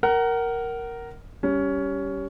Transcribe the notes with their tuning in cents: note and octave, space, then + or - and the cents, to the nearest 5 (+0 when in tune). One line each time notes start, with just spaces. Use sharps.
A#4 +0 F#5 +30
G3 -5 C#4 +15